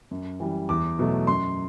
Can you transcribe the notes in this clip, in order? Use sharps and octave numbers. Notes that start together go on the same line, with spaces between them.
F#2
E3 G3
E2 D6
B2 F#3 A3
F#2 C6